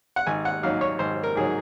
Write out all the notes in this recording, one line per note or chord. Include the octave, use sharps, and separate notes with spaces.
F#5
G#1 G#5
F#5
G#2 F#3 F5
C#5
G#1 C5
A#4
G#2 F#3 G#4